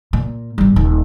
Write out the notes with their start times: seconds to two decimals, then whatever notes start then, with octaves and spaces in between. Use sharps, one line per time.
0.13 A#2
0.58 G1 G3
0.76 D#1